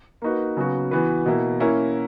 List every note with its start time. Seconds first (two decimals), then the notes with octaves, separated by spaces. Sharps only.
0.22 A#3 D#4 F#4 B4
0.57 C#3 F#3 B3 F#4
0.91 E3 B3 F#4 B4
1.26 B2 A#3 E4
1.60 A#3 C#4 E4 A#4